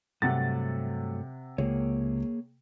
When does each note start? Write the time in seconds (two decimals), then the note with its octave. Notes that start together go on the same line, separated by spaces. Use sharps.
0.22 G2 C3 F#3 A3 F#5 A6
1.58 C#2 A#3 G#4 C#5